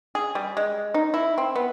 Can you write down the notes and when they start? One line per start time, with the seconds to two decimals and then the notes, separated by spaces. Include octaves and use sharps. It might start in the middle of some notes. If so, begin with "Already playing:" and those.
0.15 G#4
0.35 G3
0.57 G#3
0.94 D#4
1.14 E4
1.38 C4
1.55 B3